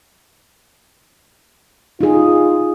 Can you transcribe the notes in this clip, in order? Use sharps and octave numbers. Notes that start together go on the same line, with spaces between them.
D#4 F4 G#4